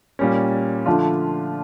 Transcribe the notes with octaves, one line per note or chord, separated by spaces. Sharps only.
A#2 G3 C#4
D3 F3 A3 D4 F4